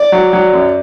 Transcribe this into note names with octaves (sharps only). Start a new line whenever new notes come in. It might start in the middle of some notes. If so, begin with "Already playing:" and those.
Already playing: D5
F#3
F#3
F#2